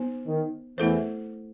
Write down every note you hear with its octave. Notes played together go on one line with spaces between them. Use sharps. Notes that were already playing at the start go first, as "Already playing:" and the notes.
Already playing: B3 D#4 C5
D#3
E2 E3 A3 E4 A4 C5